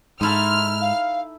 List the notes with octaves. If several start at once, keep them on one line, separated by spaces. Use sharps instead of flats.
G#2 D#4 E4 A4 C6 F6
F5